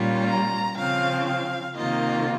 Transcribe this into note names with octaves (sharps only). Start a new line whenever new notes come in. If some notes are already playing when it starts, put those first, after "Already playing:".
Already playing: A#2 G3 C#4 F4
A#5
C#3 F3 C4 F5
F5
C3 D#3 A#3 F4 D#5